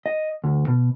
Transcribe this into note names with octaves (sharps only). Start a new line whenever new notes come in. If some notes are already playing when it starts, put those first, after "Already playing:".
D#5
D2
B2